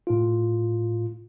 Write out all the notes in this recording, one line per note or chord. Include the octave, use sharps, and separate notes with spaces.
A2 F4